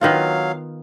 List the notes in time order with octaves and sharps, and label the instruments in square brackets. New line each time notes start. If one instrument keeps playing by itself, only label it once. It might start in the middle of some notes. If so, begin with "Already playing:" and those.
[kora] D#3 B3 F4 [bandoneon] F#3 F5